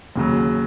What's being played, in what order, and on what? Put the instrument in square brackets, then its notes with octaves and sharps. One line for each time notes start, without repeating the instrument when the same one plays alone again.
[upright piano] D#2 C#3 F#3